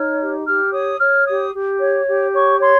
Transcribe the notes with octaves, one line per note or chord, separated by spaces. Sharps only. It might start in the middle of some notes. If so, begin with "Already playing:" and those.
Already playing: D#4 C#5 F6
G4
G4 F6
C#5 D#6
C#5 F6
G4 D#6
G4
C#5
G4
C#5 C#6
C#5 C6